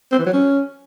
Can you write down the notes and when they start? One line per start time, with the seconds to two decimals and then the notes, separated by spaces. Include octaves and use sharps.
0.12 C4
0.19 E3
0.26 F#3
0.33 C#4